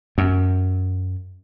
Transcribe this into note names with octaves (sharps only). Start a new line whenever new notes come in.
F#2